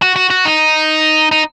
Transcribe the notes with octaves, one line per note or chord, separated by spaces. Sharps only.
F#4
F#4
F#4
D#4
D#4